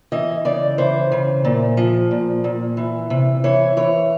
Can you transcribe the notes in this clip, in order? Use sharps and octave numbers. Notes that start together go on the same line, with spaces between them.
E3 D#5
C#3 D5
E3 C5
C#3
A#2
F3
A#2
A#2
E3
C3
E3 C#5
E3 C#5